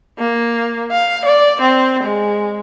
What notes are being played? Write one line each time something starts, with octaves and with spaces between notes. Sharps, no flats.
A#3
F5
D5
C4
G#3